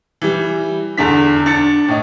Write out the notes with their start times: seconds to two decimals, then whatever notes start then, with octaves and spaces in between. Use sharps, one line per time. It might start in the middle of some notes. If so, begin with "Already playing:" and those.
0.22 E3 G3
0.98 E2 D3 D4 B6
1.46 D4 A6 C#7
1.88 A2 D#4